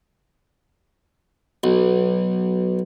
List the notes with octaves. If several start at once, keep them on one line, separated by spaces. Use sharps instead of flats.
B1